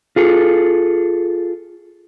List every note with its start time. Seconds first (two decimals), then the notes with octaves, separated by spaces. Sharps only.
0.16 F4 G#4 A4